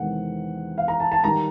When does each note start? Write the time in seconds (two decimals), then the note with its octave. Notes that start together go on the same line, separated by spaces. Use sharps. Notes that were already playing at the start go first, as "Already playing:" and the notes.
Already playing: E2 C3 D#3 G#3 F#5
0.78 F5
0.88 A#5
1.00 A5
1.12 A5
1.24 D#3 G3 A#5